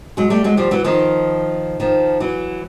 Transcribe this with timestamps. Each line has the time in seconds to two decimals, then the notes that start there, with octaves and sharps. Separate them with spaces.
0.17 F#3 G#3
0.30 G3 A3
0.44 F#3 G#3
0.57 F3 G3
0.71 E3 F#3
0.84 D#3 F3
1.80 D#3 F3
2.20 E3 F#3